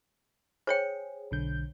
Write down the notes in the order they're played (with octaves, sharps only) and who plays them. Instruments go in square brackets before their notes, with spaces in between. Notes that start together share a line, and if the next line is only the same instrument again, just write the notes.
[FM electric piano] G#4 [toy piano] C5 C#5 G5
[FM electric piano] B1 D3 G6